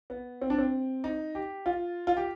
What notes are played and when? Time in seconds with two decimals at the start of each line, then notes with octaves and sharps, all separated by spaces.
0.10 B3
0.41 C4
0.50 D4
0.58 C4
1.04 D#4
1.35 G4
1.66 F4
2.07 F4
2.17 G4